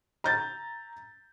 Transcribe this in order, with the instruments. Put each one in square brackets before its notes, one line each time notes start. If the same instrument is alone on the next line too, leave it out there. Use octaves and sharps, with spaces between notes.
[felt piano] A#5 G6 A6